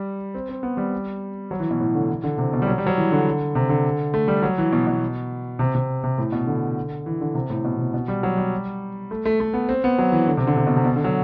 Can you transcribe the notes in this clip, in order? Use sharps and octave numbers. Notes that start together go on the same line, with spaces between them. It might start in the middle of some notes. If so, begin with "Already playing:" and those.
Already playing: G3
C4
C4
B3
G3
F#3
E3
B2
A2
D3
E3
D3
C3
B2
G3
F#3
G3
F#3
E3
D3
C3
D3
A3
G3
F#3
E3
B2
B2
C3
C3
C3
A2
B2
D3
E3
D3
C3
A2
B2
C3
B2
G3
F#3
G3
A3
A3
A3
B3
C4
B3
F#3
E3
D3
C3
D3
C3
B2
C3
B2
D3
F#3